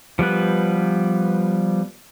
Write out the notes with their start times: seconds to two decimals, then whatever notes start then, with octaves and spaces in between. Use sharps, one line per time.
0.19 F3 G3 B3 B4